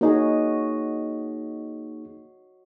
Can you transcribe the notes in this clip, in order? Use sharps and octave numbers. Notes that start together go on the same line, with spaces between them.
A#3 D#4 F#4 G#4 C#5 D#5